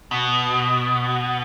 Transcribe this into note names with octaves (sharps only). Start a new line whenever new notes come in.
B2